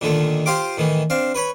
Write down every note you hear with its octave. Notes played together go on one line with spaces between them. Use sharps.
A#2 D3 D#3 A3
F4 G4 C5 F5 G5 D6
A2 D#3 E3
C4 D4 F5
B4 C#5 B5